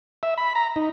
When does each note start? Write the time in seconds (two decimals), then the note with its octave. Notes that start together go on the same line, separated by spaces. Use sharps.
0.23 E5
0.38 B5
0.55 A#5
0.76 D#4